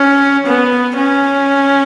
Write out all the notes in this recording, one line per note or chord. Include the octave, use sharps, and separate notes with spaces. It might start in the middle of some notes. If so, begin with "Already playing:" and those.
Already playing: C#4
B3
C#4